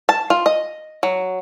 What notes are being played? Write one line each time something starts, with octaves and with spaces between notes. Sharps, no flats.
A5
F4
D#5
F#3